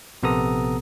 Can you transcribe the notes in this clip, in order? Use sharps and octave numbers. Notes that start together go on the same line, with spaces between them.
A#1 C3 B3 A4 A#5 D#6